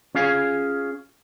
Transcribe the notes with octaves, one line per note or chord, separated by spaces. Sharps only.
C#4 F4 G#4 F5 G#5